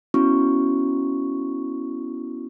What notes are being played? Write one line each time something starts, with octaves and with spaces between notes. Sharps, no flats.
B3 C#4 E4 F#4 C#6